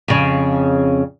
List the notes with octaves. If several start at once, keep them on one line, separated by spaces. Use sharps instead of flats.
F2 C#3